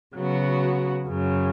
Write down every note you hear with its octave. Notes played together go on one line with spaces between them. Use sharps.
C#3 F#3 B3 F#4
F#2 C#3 F#3